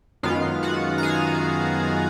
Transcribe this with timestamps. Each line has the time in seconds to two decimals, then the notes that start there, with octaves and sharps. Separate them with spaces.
0.23 F#2 D#3 G#3 B3 F4 F5
0.63 F#4 F#5
0.98 A#5
1.03 G#4 G#5